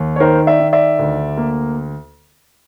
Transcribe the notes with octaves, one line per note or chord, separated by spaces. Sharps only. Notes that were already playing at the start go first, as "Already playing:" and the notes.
Already playing: D#2
C#5
D#3 A#4 C5
D5 E5
D#3
D5 E5
D2
A#3